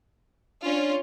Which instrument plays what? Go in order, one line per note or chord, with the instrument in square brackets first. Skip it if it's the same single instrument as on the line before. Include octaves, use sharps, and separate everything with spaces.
[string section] C#4 F4 [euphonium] D4